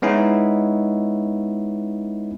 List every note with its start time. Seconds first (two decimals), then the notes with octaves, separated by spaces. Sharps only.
0.02 G#3 B3 C#4 D#4 E4